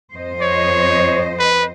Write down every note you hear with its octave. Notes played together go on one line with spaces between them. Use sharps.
F2 C5 D#5
C#5
B4